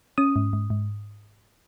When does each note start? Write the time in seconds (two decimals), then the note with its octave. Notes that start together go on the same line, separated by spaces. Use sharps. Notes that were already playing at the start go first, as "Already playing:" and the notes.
0.18 C#4 D#6
0.36 G#2
0.53 G#2
0.70 G#2